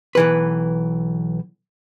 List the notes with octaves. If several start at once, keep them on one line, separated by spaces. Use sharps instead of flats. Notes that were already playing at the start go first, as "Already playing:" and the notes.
B1 E3 B4